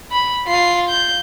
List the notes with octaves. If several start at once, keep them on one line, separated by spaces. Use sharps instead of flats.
B5
F4 C7
G6